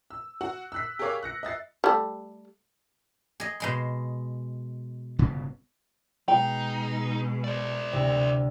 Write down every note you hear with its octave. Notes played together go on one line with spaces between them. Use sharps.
E6
F#4 F#5
E6 F#6 B6
G4 G#4 A#4 C#5 F5 D6
F#6 A#6 C#7
D#5 E5 A6 C7
G3 A3
G#4 D#5
B2 G#3 C6
G1 C#3 B3
B2 G#3 D#4 G5
C5 D5
D2 C3